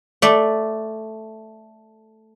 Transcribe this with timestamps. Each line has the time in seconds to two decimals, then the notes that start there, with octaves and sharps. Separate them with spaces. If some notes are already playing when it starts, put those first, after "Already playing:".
0.22 A3 D5